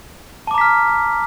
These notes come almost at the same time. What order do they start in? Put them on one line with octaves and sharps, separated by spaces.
A5 D6 A#5 B6 F6